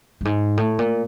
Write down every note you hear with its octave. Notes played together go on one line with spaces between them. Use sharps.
G2
G#2
A2
A#2